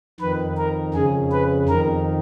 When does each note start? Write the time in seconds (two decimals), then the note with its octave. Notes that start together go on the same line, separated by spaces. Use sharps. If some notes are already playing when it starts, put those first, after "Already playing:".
0.20 F2 D#3 B4
0.58 A#4
0.94 F2 C#3 G#4
1.32 B4
1.69 F2 D#3 A#4